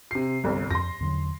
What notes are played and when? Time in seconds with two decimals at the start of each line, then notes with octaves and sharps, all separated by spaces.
0.11 C3 C7
0.44 G1 C2
0.71 F2 C6 A#6
1.00 E2 D3 F#3